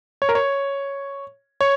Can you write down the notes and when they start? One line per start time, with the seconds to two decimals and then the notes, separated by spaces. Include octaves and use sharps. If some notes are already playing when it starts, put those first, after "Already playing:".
0.22 C#5
0.29 A#4
0.35 C#5
1.61 C#5